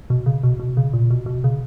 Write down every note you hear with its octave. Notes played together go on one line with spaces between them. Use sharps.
B2
C#3
B2
B2
C#3
A#2
B2
B2
C#3